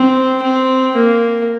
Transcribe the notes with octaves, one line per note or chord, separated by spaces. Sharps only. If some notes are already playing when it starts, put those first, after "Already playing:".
Already playing: C4
C4
A#3